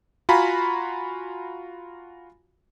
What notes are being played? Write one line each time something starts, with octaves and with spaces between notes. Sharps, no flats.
F4 F#4 F5 G#5 A#5 B5